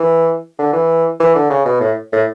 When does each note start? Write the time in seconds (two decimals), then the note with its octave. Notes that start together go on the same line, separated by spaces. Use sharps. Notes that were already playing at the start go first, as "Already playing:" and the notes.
Already playing: E3
0.59 D3
0.73 E3
1.20 E3
1.35 D3
1.50 C#3
1.65 B2
1.81 A2
2.12 A2